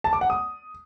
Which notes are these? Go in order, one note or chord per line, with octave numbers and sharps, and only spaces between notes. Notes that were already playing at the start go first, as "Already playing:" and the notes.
A5
D6
F#5
D#6